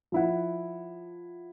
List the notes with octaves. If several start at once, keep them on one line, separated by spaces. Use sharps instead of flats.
F3 E4 F#5